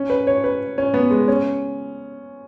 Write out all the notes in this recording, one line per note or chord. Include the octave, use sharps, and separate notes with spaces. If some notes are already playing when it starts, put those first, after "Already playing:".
Already playing: C#4
B4
C#5
B4
C#4
B3
G#3
C#4